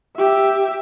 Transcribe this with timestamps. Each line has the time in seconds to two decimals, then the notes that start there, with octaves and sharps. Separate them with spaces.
0.17 G4 E5